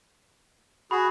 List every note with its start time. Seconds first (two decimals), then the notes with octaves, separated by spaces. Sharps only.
0.91 F#4 G#4 B5